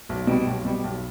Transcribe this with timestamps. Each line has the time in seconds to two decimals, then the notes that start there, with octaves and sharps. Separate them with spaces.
0.09 B1
0.27 B2 G3
0.47 B1
0.65 B2 G3
0.84 B1